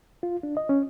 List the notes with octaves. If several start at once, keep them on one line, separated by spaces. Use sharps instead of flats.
F4
D4
D#5
C#4